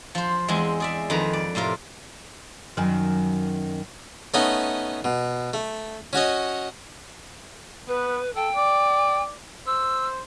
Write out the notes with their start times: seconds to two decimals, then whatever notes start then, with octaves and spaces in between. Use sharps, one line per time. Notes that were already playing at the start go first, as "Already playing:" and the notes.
0.15 F3 C5
0.48 E2 G#3 C4 G#5
0.80 G#4 D5 E5
1.10 F2 D#3 B4 A#5
1.33 D5
1.55 A2 C3 F4 A#4
2.77 F#2 D#3
4.34 A3 B3 C#4 D#4 D#5
5.04 B2
5.54 A3
6.13 C#4 F#4 C#5 D#5
7.88 B3 B4
8.36 A4 G5
8.56 D5
9.67 C5 E6